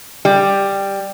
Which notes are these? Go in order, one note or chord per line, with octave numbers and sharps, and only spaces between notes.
G3